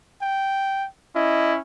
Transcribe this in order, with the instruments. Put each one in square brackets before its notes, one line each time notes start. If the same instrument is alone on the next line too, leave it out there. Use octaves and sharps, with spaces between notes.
[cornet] G5
[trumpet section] C#4 E4 [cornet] D#5